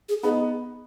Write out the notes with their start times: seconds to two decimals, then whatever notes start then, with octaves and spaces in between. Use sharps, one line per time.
0.09 G#4
0.23 B3 D#4 G#4